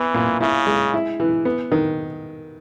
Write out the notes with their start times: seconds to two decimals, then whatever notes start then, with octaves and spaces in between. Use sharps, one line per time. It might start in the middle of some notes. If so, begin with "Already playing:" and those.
Already playing: E3 B3
0.14 A#2
0.41 C#3 E4
0.67 G#3
0.94 E4
1.20 E3
1.45 B3
1.72 D#3